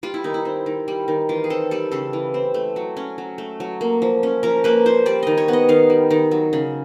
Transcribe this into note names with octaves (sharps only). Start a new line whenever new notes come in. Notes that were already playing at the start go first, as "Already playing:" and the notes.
G3 F4
E4
D#3 D#4
E4
C4
D#3
G3
D#3
E3 F4
G#4
C4 A4
G3 A4
C#3 A4
E3
C4
A3
F#3
C#4
F#3
A3
F#3
A#3
F3
C#4
F3 A#4
A#3 B4
F3 C5
G3 D5
D#3 D#5
C#5
B3
D#5
D#3 F5
G3
D#3
F#3
C#3